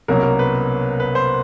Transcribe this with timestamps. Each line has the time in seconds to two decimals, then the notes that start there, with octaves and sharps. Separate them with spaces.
0.08 C2 B2 F#3 A#3 C#4 A#4
0.23 A#4
0.39 B4
1.00 B4
1.15 C5